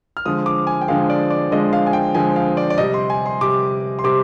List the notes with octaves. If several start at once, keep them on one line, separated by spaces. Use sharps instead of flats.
F6
D3 F3 G#3 D#6
D6
G#5
G5
D3 F3 G#3 F5
D5
D5
D3 F3 G#3 D#5
F5
G#5
G5
D3 F3 G#3 G#5
F5
D5
D5
C3 G3 D#5
C6
G#5
C6
C3 G3 D6
C6
C3 G3 D6